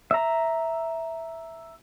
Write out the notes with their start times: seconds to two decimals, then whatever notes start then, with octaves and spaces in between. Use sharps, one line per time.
0.11 E5 A#5